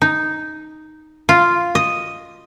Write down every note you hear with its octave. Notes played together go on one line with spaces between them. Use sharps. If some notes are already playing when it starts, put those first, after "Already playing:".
D#4
F4
D#5